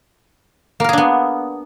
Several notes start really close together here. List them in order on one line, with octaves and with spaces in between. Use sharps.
A#3 A#4 G#4 D4 B3